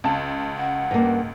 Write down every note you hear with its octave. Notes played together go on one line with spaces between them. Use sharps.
C#2 A5
F#5
G2 A#3